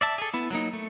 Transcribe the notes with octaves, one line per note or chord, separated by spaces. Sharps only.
D5 E5 A5
G#4 A4
B3 E4
F#3 A#3 D#4
A3